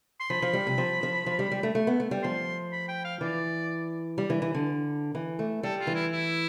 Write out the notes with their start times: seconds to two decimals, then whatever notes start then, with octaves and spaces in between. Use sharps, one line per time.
0.20 C6
0.30 F3 B5
0.42 F3
0.53 G3
0.67 C3
0.78 F3
1.03 F3
1.26 F3
1.39 G3
1.51 G3
1.63 A3
1.75 A3
1.87 B3
2.00 A3
2.11 G3
2.24 F3 C6
2.73 B5
2.89 G5
3.05 F5
3.21 E3 D5
4.18 G3
4.30 E3
4.42 E3
4.55 D3
5.15 E3
5.39 A3
5.63 G3 A4
5.80 F4
5.87 E3
5.95 E4
6.12 E4